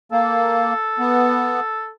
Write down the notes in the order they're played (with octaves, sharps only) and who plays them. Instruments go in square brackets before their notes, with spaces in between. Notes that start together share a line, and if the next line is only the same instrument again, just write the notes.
[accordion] A#3 [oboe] A4
[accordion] B3